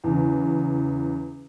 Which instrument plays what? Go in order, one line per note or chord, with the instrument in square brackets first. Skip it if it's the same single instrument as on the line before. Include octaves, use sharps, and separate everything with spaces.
[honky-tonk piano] E2 C#3